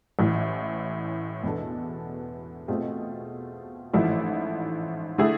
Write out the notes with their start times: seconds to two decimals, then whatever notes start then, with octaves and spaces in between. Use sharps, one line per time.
0.19 A1 A2 E3
1.43 E2 B2 B3 D4 A4
2.68 B2 A3 C4 F4 G#4
3.93 A1 G#2 F3 A3 E4
5.18 D3 A3 E4 G#4